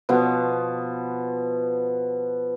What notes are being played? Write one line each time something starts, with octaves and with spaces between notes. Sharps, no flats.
B2 F3 B3 C6